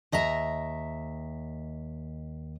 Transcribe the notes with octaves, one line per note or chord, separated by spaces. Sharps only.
D#2 D#5 E5 A#5